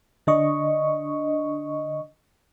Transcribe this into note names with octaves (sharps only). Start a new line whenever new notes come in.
D3 D4 D#5 C#6